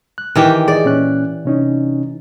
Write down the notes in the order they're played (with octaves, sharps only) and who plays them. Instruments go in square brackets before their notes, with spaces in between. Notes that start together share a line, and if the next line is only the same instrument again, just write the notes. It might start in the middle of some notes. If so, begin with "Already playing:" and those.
[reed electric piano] F#6
[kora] D#3 E3 G4
[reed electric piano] G#4 D#5 [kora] D5
[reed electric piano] A#2 C#4 F#6
C3 C#4 D#4